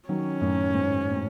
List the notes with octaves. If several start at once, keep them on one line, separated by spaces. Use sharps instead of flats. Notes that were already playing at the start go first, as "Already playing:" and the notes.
D#3 F#3 C#4
F#2 A2
G#2
A2